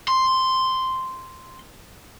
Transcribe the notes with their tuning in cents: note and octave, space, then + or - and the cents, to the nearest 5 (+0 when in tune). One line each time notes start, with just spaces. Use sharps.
C6 -5